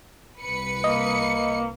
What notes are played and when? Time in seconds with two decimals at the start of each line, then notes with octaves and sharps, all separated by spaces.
0.42 C2 B4 C#7
0.84 A#3 D#5